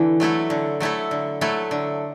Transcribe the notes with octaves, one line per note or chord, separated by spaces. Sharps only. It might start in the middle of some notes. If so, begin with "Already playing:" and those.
Already playing: D3 E3
F#3 A3 E4 A4
D3
F#3 A3 E4 A4
D3
F#3 A3 E4 A4
D3